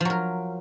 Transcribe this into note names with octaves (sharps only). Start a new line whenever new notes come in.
F3 F#3 A#4